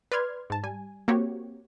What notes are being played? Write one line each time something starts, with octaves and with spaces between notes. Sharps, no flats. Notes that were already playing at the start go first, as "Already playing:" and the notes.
B4 D5 C6 F6 G#6
G#2 A5
G3 G#5
A#3 C4 F#4 G4 C#5